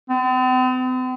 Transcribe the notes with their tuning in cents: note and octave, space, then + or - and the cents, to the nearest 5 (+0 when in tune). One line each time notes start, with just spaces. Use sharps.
C4 -45